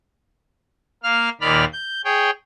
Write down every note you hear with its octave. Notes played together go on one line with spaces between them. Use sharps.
A#3 F5 F6
D#2 A#2 D#3 D5 B5 F6
G6
G#4 C#5 G5